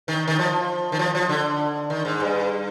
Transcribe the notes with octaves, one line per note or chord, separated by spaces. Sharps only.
D#3
D#3
F3
D#3
F3
F3
D3
D#3
G#2
G2